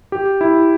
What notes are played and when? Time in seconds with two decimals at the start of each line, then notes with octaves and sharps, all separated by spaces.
0.12 G4
0.41 E4